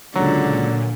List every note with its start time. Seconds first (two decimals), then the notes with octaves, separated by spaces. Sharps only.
0.16 C#2 A#2 D3 F#3